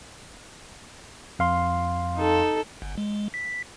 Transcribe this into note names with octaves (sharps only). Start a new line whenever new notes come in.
F2 F5 C6
D#4 A4
G1
G#3
B6